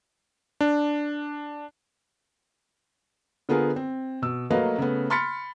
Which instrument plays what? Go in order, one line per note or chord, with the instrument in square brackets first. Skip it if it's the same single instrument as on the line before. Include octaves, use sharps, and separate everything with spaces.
[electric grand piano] D4
[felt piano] D3 B3 F4 G#4 A#4
C4
B2 E6
F#3 A3 A#3 B4 D#5 F5
C#3 A3 B3
B5 C6 F6 A6 B6 C#7